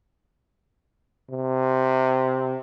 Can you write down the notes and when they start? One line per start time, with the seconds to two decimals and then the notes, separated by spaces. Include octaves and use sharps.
1.31 C3